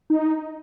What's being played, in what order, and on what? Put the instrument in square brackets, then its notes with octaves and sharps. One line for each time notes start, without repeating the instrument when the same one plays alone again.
[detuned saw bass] D#4